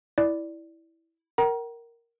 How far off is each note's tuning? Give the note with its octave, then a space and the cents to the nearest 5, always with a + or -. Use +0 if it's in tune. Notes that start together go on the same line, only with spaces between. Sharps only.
E4 -5 D5 +0
A#4 +0 G5 -45 A#5 +30